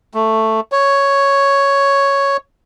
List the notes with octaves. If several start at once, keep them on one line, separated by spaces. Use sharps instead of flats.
A3
C#5